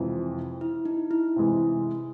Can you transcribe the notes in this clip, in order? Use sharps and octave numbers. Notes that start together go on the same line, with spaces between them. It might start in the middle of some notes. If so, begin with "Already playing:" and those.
Already playing: F2 C3 E3 G#3
E4
D#4
E4
C3 E3 G#3